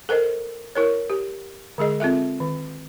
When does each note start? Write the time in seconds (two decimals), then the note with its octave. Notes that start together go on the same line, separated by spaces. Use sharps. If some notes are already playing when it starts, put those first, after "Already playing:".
0.09 A4 A#4 C5 D#5
0.75 E4 A#4 C#5
1.10 G4
1.78 D3 G#3 G#4 D#5
2.00 C4 F4 A4 E5
2.40 D#3